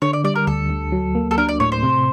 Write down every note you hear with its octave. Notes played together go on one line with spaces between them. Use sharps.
D3 C#5
D5
G3 D5
A#4
D2 A4
D2
F#3
A#3
A4
D4 A#4
D5
A2 C#5
C5
C3